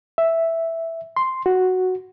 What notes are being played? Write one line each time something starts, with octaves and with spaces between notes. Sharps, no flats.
E5
C6
F#4